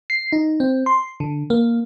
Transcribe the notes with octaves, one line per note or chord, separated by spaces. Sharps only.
C7
D#4
C4
C6
D3
A#3